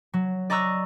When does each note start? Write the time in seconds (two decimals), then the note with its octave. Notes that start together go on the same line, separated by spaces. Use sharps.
0.14 F#3
0.50 D5 D#5 A#5 C#6 E6 F#6